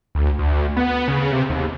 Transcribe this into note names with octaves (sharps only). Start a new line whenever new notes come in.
D2
D2
B3
C#3
C3
D#2